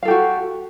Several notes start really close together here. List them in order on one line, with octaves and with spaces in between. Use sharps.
F5 A4 G4 F#4